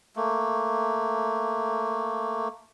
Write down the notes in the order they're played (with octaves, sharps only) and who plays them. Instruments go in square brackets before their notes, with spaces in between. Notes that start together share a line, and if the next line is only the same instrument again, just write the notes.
[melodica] A3 A#3